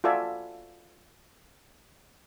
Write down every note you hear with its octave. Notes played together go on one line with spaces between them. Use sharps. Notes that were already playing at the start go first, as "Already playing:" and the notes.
F4 F#4 A4 D5 E5 G#5